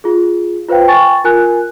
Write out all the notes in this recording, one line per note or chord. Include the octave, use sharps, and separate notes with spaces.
F4 G#4
F4 B4 C5 F5 G5
G5 G#5 C#6 A6
F4 A#4 G#5 F#6